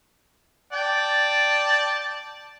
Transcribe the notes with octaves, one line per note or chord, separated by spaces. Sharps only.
D5 G5 A5